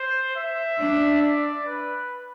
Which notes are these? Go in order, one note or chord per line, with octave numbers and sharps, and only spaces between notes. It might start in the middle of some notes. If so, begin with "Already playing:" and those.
Already playing: C5
E5
D4
D5
B4